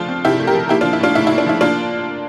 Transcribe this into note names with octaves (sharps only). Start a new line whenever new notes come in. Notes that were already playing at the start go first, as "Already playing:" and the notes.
Already playing: F3 A3 D4 F4
C4
C3 E4 G4
A3
G4 A#4
F3
A#3 E4 G4
D4 F4
F3
E4
A2 D4 F4
A2 E4
E4
A#3
D4
F3 E4
A#3 D4 F4